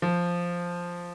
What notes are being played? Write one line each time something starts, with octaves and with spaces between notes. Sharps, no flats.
F3